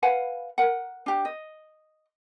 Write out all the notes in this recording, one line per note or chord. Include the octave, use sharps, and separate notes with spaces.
B4 F5 F#5 G#5
A#4 F#5
D4 G4
D#5